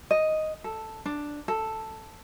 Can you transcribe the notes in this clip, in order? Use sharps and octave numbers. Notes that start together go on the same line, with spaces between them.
D#5
A4
D4
A4